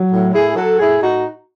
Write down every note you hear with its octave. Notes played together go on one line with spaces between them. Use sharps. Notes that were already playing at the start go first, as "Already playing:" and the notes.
Already playing: F#3
A2
A2 E4 G#4
F#3 F#4 A4
A2 E4 G#4
A2 D#4 F#4